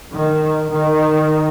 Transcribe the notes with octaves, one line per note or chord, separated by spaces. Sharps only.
D#3
D#3